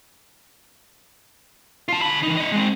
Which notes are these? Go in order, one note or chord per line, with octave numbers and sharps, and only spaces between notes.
F4 A5
D3 B5
E3 D#4
E4 D#5
G#3 C4